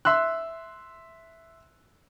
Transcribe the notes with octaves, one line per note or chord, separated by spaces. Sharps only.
E5 C6 E6 F#6